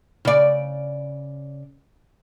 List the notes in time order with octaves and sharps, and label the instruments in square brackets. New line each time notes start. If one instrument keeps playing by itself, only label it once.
[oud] C#3 D5